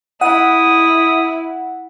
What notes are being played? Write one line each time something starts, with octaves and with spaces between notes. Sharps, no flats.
E4 F#5 D#6